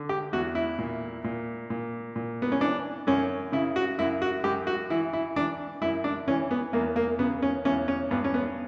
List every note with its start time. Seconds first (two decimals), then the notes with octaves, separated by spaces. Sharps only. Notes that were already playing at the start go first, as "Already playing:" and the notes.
Already playing: D3
0.09 G4
0.33 E2 F#4
0.55 E4
0.78 A#2
1.24 A#2
1.70 A#2
2.16 A#2
2.42 B3
2.52 C#4
2.61 E3 D4
3.07 F#2 C#4
3.52 C#3 E4
3.76 F#4
3.99 F#2 E4
4.22 F#4
4.44 F#2 G4
4.67 F#4
4.90 E3 E4
5.13 E4
5.36 E3 D4
5.82 F#2 E4
6.04 D4
6.28 E3 C#4
6.51 B3
6.73 E2 A#3
6.96 A#3
7.19 C#3 B3
7.42 C#4
7.65 E2 C#4
7.88 C#4
8.11 G2 B3
8.24 C#4
8.34 B3